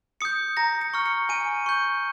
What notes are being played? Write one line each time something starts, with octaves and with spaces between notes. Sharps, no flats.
D#6 G6 C#7
A#5 A#6
C#7
C#6 F6
C#7
G#5 D#7
C#6 G6